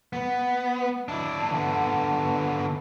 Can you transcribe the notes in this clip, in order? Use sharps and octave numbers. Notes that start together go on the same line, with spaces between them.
B3
D4 E4
D3 B3